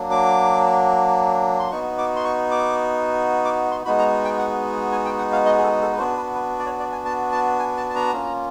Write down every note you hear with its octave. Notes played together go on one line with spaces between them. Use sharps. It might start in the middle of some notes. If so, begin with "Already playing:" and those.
Already playing: F#3 A#3 D4
D6
C6
B3 D#4 F#4 C#6
D6
C6
C#6
D6
D6
C6
G#3 B3 D#4 F#4 B5
A#5
G5
F#5
G#5
G5
F#5
F5
D#5
G#4
A4
A4
B4
B3 D4 F#4 C5
B4
B4
D5
C#5
D5
G#5
A5
A5
G#5
A5
A5
A#5
A#3 C#4 F4